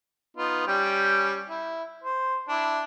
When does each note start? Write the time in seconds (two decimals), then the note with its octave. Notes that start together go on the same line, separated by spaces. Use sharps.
0.37 B3 D#4 F4
0.67 G3 C#4 G5
1.49 E4
2.04 C5
2.49 D4 E4